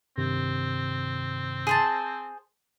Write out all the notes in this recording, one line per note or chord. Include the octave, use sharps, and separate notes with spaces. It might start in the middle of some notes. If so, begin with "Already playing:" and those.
G2 C3 D#3 C4
G#4 C5 A5